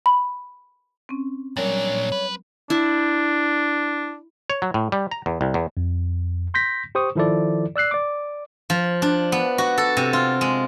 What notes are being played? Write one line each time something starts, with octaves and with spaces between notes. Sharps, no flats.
B5
C4 C#4
A#2 F#3 G3 D4 A#4 C#5
B4
D4 E4
C#5
F#3
A2
G3
A#5
E2
C2
E2
F2
C6 G6 A#6 B6
G4 C5 C#6 D#6
D#3 F3 E4 A4 D5
D5 E6 F#6 C7
D5 D6
F3
D4
B3
F#4
A4
C3
F4
G#3